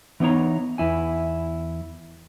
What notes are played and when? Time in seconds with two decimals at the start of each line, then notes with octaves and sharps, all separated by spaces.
0.20 E3 B3 D#4 C#5 A#5
0.78 E2 E4 G#5